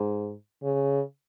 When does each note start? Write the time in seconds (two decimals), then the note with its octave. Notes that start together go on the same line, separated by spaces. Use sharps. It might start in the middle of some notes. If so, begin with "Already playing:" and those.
Already playing: G#2
0.63 C#3